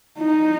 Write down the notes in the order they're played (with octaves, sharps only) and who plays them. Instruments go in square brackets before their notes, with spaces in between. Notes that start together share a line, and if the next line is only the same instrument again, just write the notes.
[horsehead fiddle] D#4